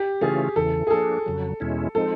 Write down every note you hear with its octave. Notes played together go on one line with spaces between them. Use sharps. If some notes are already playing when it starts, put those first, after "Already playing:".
Already playing: G4
C#3 E3 A3 C#4 F4 G#4
E2 C#3 E3 A4
G#4
F3 A#3 D4 A4
F2 C#3 F#3
E2 B2 G#3 C#4 E4
F3 G#3 C4 D#4 A4